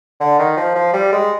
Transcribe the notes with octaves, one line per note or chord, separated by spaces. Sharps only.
D3
D#3
F3
F3
G3
G#3